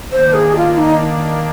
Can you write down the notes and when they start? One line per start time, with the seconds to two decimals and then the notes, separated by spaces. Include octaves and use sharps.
0.12 D#3 A#3 D4 C5
0.34 G#4
0.56 F4
0.77 D#4